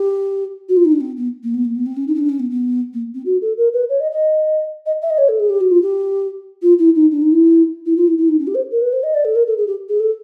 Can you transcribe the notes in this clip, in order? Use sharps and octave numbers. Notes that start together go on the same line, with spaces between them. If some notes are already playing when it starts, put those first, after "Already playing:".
Already playing: G4
F#4
F4
D#4
D4
C4
B3
A#3
B3
A#3
B3
C4
C#4
D#4
C#4
D4
C#4
B3
B3
A#3
C4
F#4
A4
A#4
B4
C#5
D#5
D#5
D#5
E5
D#5
C#5
A4
G#4
G4
F#4
F4
G4
F4
E4
D#4
D4
D#4
E4
E4
F4
E4
E4
D#4
C#4
G4
C5
A#4
B4
C5
D#5
D5
A4
A#4
A4
G#4
G4
G#4
A4